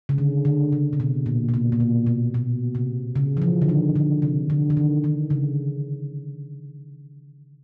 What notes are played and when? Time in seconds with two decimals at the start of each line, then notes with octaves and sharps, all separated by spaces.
0.09 C#3
0.18 D3
0.45 D3
0.72 C#3
0.93 C3
1.00 B2
1.26 A#2
1.49 A#2
1.54 B2
1.72 A#2
1.80 B2
2.06 B2
2.34 B2
2.75 C3
3.16 C#3
3.37 E3
3.42 F3
3.62 D3
3.69 D#3
3.96 D3
4.22 C3
4.50 D3
4.70 D3
4.77 D#3
5.04 D#3
5.30 C#3